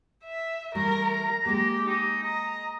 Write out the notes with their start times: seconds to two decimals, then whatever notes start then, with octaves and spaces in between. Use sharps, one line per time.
0.25 E5
0.75 E3 G3 A3 A#4 A#5
1.46 G#3 A#3 G4
1.87 D#4
2.23 D#5 A#5